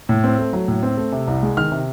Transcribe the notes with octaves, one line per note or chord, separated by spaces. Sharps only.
A2
C4
A3
F#3
A2
C4
A3
C3
C2
G#3
D#3 F6
C3